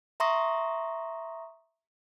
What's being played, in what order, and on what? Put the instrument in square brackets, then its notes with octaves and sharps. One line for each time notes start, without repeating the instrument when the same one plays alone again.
[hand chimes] E5 A#5 C6 C#6 D#6 A#6